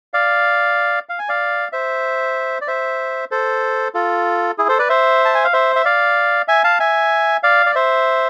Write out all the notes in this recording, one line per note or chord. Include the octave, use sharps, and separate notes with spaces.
D5 F5
F5
G#5
D5 F5
C5 E5
D5
C5 E5
A4 C5
F4 A4
E4 G#4
A4 C5
B4 D5
C5 E5
A5
G#5
F5
C5 E5
E5
D5 F5
E5 G#5
F5 A5
E5 G#5
D5 F5
D5
C5 E5